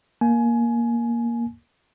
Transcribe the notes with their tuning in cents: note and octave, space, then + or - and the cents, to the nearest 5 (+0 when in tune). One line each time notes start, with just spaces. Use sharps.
A#3 +5 G#5 +20